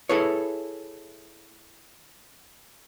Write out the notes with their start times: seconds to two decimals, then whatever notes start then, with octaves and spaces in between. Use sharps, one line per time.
0.09 E4 G#4 A4 B4 C#5